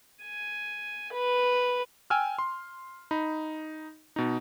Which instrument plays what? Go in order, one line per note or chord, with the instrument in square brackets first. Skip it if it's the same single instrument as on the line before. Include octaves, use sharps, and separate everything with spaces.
[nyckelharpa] G#5
B4
[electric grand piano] G5 G#5 E6 F6
C6
D#4 B5
B2 D#4